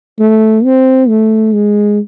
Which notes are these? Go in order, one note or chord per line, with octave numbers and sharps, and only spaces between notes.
A3
C4
A3
G#3